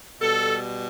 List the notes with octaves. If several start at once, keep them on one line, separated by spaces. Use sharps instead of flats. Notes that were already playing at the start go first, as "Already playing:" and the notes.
B2 G3 A4